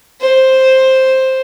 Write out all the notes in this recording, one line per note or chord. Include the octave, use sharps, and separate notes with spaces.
C5